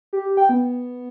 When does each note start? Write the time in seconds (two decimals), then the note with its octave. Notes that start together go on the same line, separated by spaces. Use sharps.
0.13 G4
0.37 G5
0.49 B3